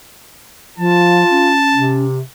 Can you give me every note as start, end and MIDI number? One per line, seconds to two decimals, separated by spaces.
0.78 1.24 53
0.78 1.53 65
0.78 2.05 81
1.30 2.06 61
1.74 2.21 48